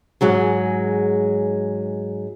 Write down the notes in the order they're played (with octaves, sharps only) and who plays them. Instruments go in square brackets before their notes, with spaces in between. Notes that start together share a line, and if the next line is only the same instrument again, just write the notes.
[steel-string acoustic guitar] G#2 F#3 G#3